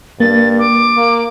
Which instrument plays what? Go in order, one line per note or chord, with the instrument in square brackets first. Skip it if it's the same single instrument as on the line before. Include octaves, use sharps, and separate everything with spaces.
[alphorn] G2 [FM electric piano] A#3 [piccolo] A6
[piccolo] D6
[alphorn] A#3